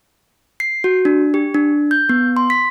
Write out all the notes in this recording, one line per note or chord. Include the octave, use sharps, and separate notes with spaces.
C7
F#4
D4
G4
D4
G6
B3
C6
B6